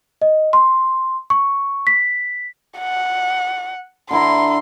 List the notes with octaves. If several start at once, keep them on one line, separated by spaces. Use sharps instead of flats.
D#5
C6
C#6
B6
F#5
D3 E4 A#5 C6